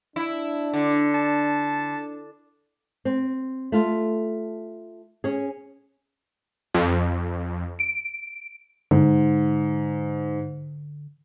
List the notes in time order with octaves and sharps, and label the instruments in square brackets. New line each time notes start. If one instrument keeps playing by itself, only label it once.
[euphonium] D4 [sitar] E4
[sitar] D3
[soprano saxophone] A5
[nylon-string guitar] C4
A3 F4
C#4 G#4
[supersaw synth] F2
D7
[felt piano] G#2 [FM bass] D3